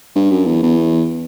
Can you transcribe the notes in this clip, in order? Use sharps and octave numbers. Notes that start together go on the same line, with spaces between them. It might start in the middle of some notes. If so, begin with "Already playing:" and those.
G2
F#2
E2
E2